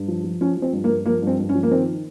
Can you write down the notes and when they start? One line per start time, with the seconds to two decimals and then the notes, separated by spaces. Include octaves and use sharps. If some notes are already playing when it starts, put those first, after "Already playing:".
Already playing: G2
0.08 F3
0.24 F3
0.41 F3 C#4
0.57 F3
0.62 C4
0.73 G2
0.84 A#3
0.89 G2
1.06 F3 A#3
1.22 G2
1.27 C4
1.39 G2
1.49 C#4
1.55 F3
1.63 A#3
1.71 D#3 C4